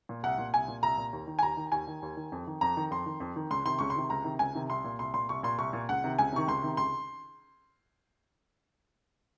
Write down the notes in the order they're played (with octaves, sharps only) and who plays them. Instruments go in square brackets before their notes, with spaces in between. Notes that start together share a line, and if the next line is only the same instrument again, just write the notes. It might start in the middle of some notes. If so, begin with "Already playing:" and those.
[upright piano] A#2
C2 F#5
A#2
C2 G#5
A#2
C2 A#5
A#2
D#2
D#3
G#5
D#2 A#5
D#3
D#2 G#5
D#3
D#2
D#3
F2
D#3
F2 A#5
D#3
F2 C6
D#3
F2
D#3
C#2 C6
C3 D#3 C6
C#2 C#6
C6
C3 D#3
C#2 A#5
C3 D#3
C#2 G#5
C3 D#3
C2 C6
A#2
C2 C6
A#2 C6
C2 C#6
A#2 C6
C2 C#6
A#2
C#2 F#5
C3 D#3
C#2 G#5
C3 D#3 C#6
C#2 C6
C3 D#3
C#2 C6